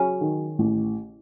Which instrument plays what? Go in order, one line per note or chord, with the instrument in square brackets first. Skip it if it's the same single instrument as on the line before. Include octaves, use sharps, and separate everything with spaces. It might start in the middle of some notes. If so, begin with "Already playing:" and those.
Already playing: [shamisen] C#3 C#4 [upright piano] F#3
[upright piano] D#3
A1